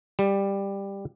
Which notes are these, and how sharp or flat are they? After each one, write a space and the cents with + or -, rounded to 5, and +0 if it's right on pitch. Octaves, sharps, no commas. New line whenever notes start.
G3 +10